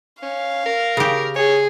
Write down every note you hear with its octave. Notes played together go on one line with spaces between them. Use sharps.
C#4 F5
A#4
C#3 G4
G#4 C#5